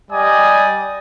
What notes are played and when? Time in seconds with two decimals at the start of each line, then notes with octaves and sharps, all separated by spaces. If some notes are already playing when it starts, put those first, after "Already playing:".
0.12 G3 D5 D#5 G#5 D#6